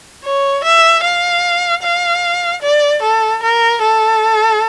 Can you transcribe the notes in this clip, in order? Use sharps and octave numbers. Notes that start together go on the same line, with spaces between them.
C#5
E5
F5
F5
D5
A4
A#4
A4